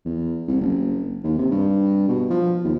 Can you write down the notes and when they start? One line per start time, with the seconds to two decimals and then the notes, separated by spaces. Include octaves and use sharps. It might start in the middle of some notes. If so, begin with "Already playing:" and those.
0.05 E2
0.48 C2
0.61 F#1
1.24 D#2
1.38 C3
1.51 G2
2.09 B2
2.30 F3
2.64 D#2